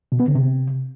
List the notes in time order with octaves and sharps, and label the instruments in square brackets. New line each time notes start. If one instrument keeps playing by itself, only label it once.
[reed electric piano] B2
B3
D3
C3